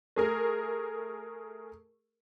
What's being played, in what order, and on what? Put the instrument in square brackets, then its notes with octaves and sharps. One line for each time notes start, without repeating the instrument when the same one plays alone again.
[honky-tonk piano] A3 G#4 A#4